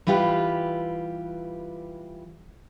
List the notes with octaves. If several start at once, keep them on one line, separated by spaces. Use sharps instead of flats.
E3 G3 F4 G4 B4